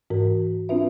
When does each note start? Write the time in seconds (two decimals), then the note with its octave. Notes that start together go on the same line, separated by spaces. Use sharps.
0.10 G#2 E3 A#4
0.69 C4 D4 F4 B4 E5